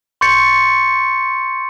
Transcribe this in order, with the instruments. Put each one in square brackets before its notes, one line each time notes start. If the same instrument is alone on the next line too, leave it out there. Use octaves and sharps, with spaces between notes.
[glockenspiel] C6 C#6 G6 A6 C#7